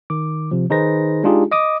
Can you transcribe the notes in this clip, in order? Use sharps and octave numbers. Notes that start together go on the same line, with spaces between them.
D#3 D6
C3 F3
D#3 D#4 G#4 B4 C5 A#6
G#3 D4 D#4 F4 G4 G#4
D#5 D6 D#6